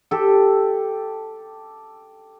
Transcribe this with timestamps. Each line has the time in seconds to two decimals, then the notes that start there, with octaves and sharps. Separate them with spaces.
0.11 G4 A4